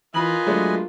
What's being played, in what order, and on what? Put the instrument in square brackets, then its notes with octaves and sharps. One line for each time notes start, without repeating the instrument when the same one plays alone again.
[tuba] E3 [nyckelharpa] F4 A#4 [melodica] B4 D#5 G#5 [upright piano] B5 F#7
[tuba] F#3 [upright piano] G#3 A3 D4